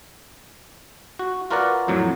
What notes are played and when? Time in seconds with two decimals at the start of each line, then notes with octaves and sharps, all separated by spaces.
1.19 F#4
1.50 F4 F#4 A#4 B4 D5 F#5
1.88 F2 A2 F#3